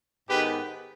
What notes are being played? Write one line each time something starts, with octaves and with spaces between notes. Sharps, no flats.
G#2 D#3 G#3 B3 G4 B4